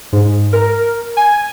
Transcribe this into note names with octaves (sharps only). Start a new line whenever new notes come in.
G#2
A#4
G#5